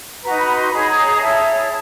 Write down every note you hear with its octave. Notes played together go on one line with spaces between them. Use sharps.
D#4 F#4 B4 A#5
B5
C6
D#4 G#4 C#5 B5
A#5
A#5
E4 G#4 C#5 A5